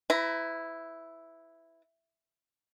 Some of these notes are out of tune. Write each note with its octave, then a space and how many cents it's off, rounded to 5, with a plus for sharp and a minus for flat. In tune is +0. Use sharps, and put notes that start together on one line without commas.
E4 +0 B4 +35 A#5 +0